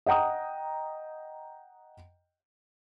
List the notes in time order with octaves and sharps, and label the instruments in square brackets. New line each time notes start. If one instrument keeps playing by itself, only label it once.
[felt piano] D#5 F#5 G5 A#5 D#6